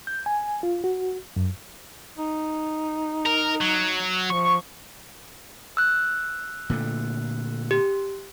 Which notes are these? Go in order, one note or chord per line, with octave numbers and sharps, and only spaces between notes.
G6
G#5
F4
F#4
F#2
D#4
A#4
F#3
F3 C#6
E6 F#6
A#2 D3 A3
G4